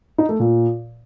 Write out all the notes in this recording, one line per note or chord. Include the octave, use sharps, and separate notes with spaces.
D#4
A3
A#2